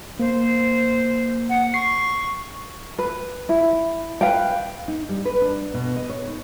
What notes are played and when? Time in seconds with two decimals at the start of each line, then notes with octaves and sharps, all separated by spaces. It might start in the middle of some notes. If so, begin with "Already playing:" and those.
0.19 A#3 C5
1.49 F#5
1.74 C#6 C7
2.99 B4
3.49 E4
4.21 B4 F5 G5
4.88 D#4
5.09 G3
5.25 B4
5.42 D4
5.74 B2
5.96 D#5
6.09 C#5
6.28 D#4